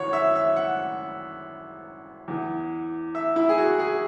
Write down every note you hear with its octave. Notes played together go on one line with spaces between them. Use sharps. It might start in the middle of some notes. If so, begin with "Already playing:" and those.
Already playing: G#1 F#2 E3 C#5 F#5
E5
E5
F#5
E2 E3
E5
E4
G#4
F#4
G#4